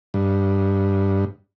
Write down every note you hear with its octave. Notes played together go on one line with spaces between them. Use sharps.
G2